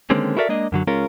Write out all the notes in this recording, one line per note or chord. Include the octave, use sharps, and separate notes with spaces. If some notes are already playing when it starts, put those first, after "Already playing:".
D3 D#3 G#3 A#3 C4 C#4
E4 F#4 A4 A#4 D5 E5
G#3 A#3 D4 D#5
F#2 D3 F#3
C#2 G#3 C#4 F4 A#4